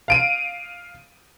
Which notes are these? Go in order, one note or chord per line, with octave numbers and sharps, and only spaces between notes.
F5 D7 D#7